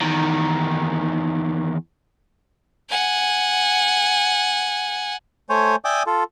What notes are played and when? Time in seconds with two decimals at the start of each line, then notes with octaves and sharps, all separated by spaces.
0.01 E2 D#3
2.90 F#5 G#5
5.50 A3 C5 C#5 G#5
5.85 D5 E5 G5 G#5 D6 D#6
6.07 F4 A4